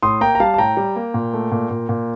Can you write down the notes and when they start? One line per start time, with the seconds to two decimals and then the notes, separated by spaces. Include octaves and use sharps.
0.03 A2 C6 D#6
0.21 A#3 G5 A#5
0.35 A#5
0.40 G3 F5 A5
0.54 A5
0.58 A2 G5 A#5
0.77 G3
0.96 A#3
1.14 A#2
1.33 A3
1.52 A#2
1.70 A#2
1.89 A#2